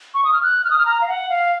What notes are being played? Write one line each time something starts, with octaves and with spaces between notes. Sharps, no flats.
C#6
D#6
F6
F#6
F6
D#6
F6
A#5
F5
F#5
F5